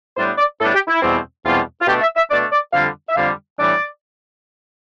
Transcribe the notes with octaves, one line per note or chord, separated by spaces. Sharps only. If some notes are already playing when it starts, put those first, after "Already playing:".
A2 G3 B3 D4 C5
D5
A2 G3 B3 D4 A4
G4
E4
E2 B2 G3 C4
E2 B2 G3 C4 F4
F4
B2 A3 D4 G4
E5
E5
B2 A3 D4 D5
D5
F2 D3 G3 F5
E5
F2 D3 G3 F5
A2 E3 G3 D4 D5